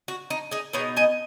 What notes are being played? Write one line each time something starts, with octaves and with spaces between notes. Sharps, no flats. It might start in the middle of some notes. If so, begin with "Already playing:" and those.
F#4
D#4
D#4 G#4
B2 B3 D#4 G#4 C#5
D#5 G#5